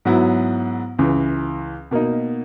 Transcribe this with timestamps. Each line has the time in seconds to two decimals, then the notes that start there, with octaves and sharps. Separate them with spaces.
0.05 G#2 F#3 B3 E4
0.99 C#2 C#3 E3
1.91 B2 A#3 D#4